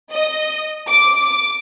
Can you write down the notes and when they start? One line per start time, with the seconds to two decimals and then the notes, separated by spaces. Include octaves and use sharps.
0.10 D#5
0.88 D6